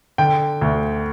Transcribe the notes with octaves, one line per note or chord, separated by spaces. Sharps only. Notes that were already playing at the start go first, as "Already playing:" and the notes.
D3 G5
D2